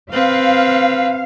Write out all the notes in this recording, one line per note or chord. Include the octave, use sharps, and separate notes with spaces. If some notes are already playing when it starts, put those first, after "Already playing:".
C4 B4 F5